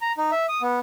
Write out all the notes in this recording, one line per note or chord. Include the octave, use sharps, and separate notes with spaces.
A#5
D#4
E5
D#6
B3